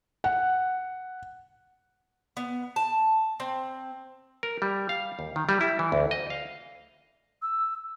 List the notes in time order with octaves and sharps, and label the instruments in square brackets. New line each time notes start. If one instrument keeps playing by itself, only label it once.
[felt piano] F#5
[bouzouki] B3
A5
C4
[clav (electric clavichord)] A#4
G3
F5
D#2
D#3
G3
E4
E3
D2
D#5
F5
[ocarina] E6